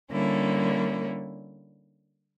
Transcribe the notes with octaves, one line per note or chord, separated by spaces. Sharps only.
D3 G3 A#3 C#4 E4